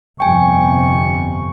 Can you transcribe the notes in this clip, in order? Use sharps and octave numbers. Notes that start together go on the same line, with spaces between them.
G1 F2 C3 G5 G#5 C#6